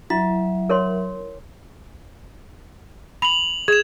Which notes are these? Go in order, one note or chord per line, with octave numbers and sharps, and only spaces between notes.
F#3 E4 E5
A#4 C#5 C6
B5 F7 F#7
G#4 G#6 E7